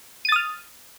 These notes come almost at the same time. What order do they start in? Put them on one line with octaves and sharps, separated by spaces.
D#7 A6 D#6 F6